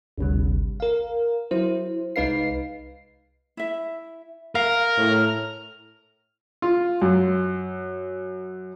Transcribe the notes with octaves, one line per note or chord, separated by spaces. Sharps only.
G#1 D2 C3 G3
A#4 F5
F#3 E4 C5
C2 G#3 D#4 B4 F5 C7
E4 E5
A#4 F5 F6
A2 C#5
F4
F#2